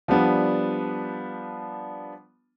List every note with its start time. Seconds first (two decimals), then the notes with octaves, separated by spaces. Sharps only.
0.08 F3 G3 B3 D4